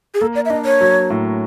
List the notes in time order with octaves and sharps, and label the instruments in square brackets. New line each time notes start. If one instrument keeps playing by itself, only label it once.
[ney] G#4
[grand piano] A#3 [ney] A4
[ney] D5
E5
[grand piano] D4 [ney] D#5
[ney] C#5
[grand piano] F#3
A2